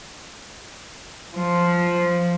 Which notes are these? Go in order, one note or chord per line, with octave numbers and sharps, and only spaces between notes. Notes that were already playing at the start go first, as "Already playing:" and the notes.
F3